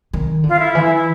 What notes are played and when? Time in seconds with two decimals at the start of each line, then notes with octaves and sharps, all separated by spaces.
0.13 D#3
0.44 D3 F4
0.59 E4
0.75 E3
0.95 E4